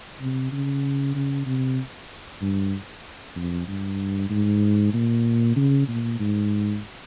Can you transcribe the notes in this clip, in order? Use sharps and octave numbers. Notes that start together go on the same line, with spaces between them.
C3
C#3
C#3
C3
G2
F2
G2
G#2
A#2
C#3
A#2
G#2